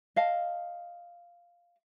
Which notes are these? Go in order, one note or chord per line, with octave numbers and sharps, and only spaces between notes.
D#5 F5 A5